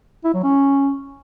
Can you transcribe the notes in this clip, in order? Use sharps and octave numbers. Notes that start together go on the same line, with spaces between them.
E4
F#3
C#4